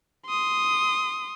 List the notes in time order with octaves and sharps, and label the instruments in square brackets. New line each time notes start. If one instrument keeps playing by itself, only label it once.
[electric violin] C6 D#6